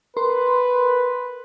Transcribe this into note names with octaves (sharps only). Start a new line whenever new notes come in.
A#4 B4 C6